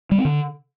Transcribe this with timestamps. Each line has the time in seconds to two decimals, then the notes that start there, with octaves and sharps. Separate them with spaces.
0.11 G3
0.18 C4
0.25 D3